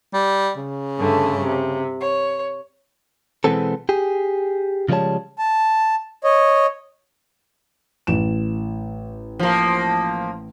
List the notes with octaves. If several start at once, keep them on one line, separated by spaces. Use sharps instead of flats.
G3
C#3
G2 D3 A3
C3
C#5
B2 E3 G#3 B3 C4 A4
G4 G#4
C#3 F3 G3 G#3 C#5 A5
A5
C#5 D#5
A1 E7
F3 A#3